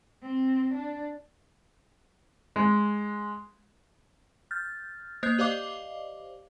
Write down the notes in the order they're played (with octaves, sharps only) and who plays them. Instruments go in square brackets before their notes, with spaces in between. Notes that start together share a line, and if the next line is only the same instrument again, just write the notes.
[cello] C4
D4
[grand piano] G#3
[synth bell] F6 G6 A6
A#3 C5 D#5 F#6 G6 C7
G4 C5 D5 D#5 F5 D6